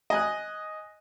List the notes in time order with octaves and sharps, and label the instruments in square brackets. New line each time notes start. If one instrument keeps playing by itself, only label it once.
[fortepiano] D#5 G#5 F#6